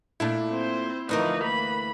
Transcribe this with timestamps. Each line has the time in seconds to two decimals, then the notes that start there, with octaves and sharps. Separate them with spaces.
0.20 A#2 A3 D4 E4
0.50 C4 C5
1.09 D2 E3 F3 D#4 A#4
1.40 A#3 B5